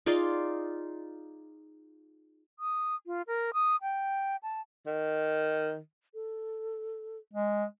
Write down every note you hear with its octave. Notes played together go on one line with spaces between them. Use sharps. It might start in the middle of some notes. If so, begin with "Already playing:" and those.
D#4 F4 G#4 D5
D#6
F4
A#4
D#6
G5
A5
D#3
A4
G#3